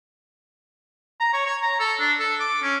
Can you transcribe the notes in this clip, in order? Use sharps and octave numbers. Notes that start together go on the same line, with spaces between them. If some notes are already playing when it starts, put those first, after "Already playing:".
A#5
C#5
C#5
A#5
A4
D4
A4
D6
C#4